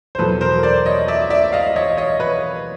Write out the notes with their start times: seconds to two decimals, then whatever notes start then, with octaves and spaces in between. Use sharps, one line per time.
0.15 C5
0.19 E2 B2 F#3 A4 B4
0.41 A#4 C5
0.63 C5 D5
0.86 C#5 D#5
1.08 D5 E5
1.30 D5 E5
1.53 D#5 F5
1.76 C#5 D#5
1.97 C#5 D#5
2.20 B4 C#5